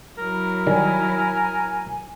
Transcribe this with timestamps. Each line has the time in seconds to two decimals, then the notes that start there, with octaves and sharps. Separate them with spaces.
0.18 F#3 E4 A#4
0.67 D#3 G3 G#5